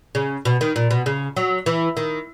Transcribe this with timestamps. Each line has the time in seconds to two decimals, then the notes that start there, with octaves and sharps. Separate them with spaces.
0.15 C#3
0.45 B2
0.61 D#3
0.76 A#2
0.91 B2
1.06 C#3
1.36 F#3
1.66 E3
1.97 D#3